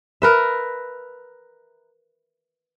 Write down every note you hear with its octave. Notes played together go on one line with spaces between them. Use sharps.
A#4 B4 E5